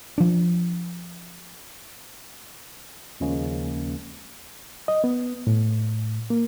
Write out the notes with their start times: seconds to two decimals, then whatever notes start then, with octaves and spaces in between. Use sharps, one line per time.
0.18 F3 D4
3.20 D#2 C#3 F3 G#3 A#3 C#4
4.88 D#5
5.04 B3
5.47 A2
6.30 A#3